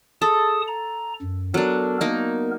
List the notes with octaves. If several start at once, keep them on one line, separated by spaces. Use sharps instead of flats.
G#4 A4 A5 D#6
A#5
F#2
F#3 B3 D4 A4 A#4
A#3 B3 D#4 A#4